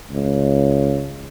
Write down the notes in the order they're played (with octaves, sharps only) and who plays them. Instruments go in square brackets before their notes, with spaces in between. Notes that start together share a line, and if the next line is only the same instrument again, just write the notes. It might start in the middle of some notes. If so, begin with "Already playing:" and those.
[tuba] C#2